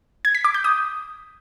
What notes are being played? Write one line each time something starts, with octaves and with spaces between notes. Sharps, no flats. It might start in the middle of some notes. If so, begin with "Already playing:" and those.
G#6
B6
D6
G6
D#6